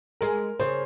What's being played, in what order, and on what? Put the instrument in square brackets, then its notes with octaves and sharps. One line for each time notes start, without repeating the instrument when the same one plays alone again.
[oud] G#3 [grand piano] A#4
[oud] C#3 [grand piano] C5